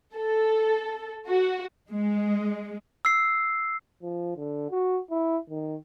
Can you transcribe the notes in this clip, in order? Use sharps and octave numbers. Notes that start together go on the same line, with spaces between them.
A4
F#4
G#3
E6 C7
F3
D3
F#4
E4
D#3